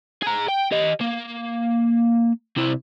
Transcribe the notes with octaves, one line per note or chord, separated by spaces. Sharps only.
G#4 A#5
G5
G4 D#5
A#3
C3 E4